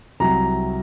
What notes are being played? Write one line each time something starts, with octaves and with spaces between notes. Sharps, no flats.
C2 C3 F#3 A#5